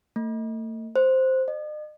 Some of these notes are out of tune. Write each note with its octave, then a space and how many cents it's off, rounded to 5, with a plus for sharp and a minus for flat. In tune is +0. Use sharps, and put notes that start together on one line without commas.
A3 +40
C5 +0
D#5 -45